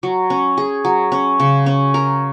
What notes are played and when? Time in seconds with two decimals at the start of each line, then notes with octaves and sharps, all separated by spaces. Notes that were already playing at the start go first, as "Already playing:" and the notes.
0.03 F#3
0.30 C#4
0.57 G#4
0.85 F#3
1.12 C#4
1.40 C#3
1.66 C#4
1.94 A#4